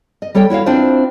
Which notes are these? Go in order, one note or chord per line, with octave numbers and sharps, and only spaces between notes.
D#5
G3 A4 C#5 G5
E4 F#4 C#5 F5
C4 D4 E4 F4 C5